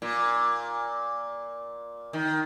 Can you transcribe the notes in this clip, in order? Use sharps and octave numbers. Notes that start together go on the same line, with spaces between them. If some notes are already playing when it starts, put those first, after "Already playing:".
A#2
D#3